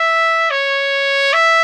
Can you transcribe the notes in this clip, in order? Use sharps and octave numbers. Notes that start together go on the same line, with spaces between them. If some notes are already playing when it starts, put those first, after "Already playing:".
Already playing: E5
C#5
E5